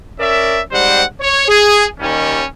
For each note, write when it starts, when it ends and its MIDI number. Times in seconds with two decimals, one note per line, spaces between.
0.19 0.60 61
0.19 0.60 70
0.19 0.60 74
0.19 0.60 76
0.71 1.02 44
0.71 1.02 55
0.71 1.02 60
0.71 1.02 72
0.71 1.02 78
1.19 1.45 73
1.48 1.85 68
2.00 2.43 39
2.00 2.43 51
2.00 2.43 55
2.00 2.43 61